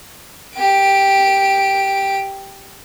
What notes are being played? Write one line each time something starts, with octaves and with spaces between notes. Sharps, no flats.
G4 D7